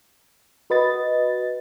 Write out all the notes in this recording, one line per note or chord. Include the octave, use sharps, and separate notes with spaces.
F#4 B4 D#5 A6